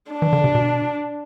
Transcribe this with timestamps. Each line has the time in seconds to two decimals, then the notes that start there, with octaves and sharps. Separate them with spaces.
0.11 D4
0.22 E3
0.33 D3
0.44 C3
0.55 B2